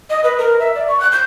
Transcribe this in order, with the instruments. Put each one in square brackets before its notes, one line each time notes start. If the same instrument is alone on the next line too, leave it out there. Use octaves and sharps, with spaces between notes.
[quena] D#5
B4
A#4
E5
D5
C#6
F#6
G6